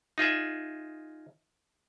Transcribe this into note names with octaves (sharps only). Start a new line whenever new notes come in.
D#4 F4 G#4 E5